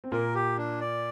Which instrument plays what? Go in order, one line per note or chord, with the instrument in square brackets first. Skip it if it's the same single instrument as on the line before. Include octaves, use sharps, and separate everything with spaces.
[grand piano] C4
[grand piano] A#2 A#3 [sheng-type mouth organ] A#4
[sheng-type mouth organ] G4
D4
D5